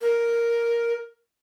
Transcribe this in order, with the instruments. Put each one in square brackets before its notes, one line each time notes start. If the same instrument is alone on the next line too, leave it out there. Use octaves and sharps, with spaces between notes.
[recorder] A#4